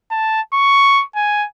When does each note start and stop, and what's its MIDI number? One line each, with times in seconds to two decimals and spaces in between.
0.11 0.41 81
0.54 1.04 85
1.16 1.46 80